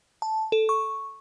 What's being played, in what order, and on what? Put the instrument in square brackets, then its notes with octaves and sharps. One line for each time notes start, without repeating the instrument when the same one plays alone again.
[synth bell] A5
A4
C#6